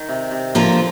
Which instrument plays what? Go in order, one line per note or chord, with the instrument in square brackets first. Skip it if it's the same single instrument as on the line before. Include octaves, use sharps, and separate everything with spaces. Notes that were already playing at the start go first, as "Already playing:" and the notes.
Already playing: [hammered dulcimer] D#3
C3
C3
[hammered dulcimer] D3 [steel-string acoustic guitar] F3 A#3 F4 A#4